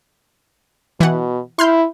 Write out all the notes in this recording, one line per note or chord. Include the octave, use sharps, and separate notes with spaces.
B2 E3 F#5
E4 C6 F6 G6